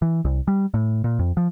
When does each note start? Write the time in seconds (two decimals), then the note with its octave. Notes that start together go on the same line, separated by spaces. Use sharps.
0.02 E3
0.25 C2
0.48 G3
0.74 A2
1.04 A#2
1.19 F2
1.37 F3